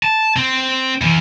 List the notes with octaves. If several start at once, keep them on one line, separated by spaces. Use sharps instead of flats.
A5
C4
E2 E3